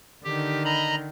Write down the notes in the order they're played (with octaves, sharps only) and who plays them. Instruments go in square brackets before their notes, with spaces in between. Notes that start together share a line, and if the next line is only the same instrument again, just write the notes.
[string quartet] D3 D#3 [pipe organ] G4
[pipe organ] D#5 A#5 B5